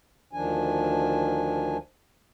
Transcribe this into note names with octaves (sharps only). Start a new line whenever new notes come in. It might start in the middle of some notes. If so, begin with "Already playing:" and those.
D2 D#3 F3 D4 G#5